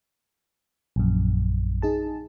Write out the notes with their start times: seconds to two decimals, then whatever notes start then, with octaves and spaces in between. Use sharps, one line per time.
0.96 A#1 F#2
1.82 D#4 G#4 A5